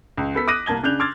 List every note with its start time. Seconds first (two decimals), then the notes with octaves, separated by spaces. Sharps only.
0.17 C#2
0.35 B3 A4 B6
0.48 D6 D#6 F#6 A#6 D#7
0.66 C2 A#3 A5 G#6 G7
0.83 C#3 D4 F#6 G6 F7
1.00 C6 D6 E6 F6 G#6 A6